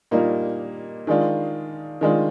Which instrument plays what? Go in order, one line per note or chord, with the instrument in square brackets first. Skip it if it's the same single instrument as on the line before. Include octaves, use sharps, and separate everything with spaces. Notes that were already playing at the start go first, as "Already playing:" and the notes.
[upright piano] A#2 G3 A#3 D#4
D#3 G#3 D4 F4
D#3 G#3 D4 F4